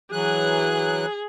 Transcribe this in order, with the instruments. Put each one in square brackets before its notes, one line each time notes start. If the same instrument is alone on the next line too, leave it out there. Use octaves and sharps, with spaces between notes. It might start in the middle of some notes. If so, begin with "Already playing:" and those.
[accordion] E3 F#3 F#6 [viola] G#4